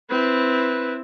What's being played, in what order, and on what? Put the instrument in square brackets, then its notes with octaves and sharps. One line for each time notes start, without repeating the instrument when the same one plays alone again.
[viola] C4 E4 [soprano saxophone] B4